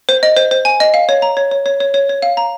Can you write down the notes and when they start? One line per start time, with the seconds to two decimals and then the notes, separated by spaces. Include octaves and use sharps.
0.09 C5
0.23 D#5
0.36 C5
0.51 C5
0.65 G#5
0.80 D#5
0.94 F5
1.09 C#5
1.22 A#5
1.37 C#5
1.51 C#5
1.66 C#5
1.80 C#5
1.94 C#5
2.09 C#5
2.22 F5
2.37 A#5